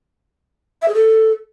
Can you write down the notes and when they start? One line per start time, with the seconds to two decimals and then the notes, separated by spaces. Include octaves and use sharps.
0.82 E5
0.88 G#4
0.94 A4